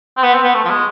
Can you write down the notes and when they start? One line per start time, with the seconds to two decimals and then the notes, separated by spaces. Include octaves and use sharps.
0.17 C4
0.23 B3
0.34 C4
0.44 B3
0.55 A3
0.65 F3
0.69 G#3